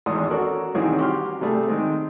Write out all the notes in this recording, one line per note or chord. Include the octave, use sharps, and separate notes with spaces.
G#1 E2 G#2 G#3 C6 D#6
C#4 F#4 A4 A#4 D5
C2 D#3 E3 C4 C#4 G#4
F#4 G4 C6 F6
C3 G3 A3 G#4
D#3 G#3 C4